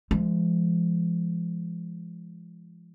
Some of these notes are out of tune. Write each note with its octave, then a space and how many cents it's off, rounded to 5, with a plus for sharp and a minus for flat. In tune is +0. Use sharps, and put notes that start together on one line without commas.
F3 -40 G#3 +0